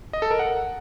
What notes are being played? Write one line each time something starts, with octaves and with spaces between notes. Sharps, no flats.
D#5
A4
A#4
F#5